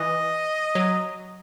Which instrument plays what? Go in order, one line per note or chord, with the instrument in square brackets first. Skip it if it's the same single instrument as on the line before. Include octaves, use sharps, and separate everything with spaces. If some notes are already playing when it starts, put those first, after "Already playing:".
Already playing: [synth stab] E3 [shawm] D#5
[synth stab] F#3